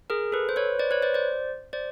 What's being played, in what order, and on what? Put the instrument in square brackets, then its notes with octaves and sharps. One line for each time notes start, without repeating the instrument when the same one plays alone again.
[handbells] G#4 A#4
A4 B4
C5
B4 C#5
C5 D5
B4 C#5
C5 D5
C5 D5
C5 D5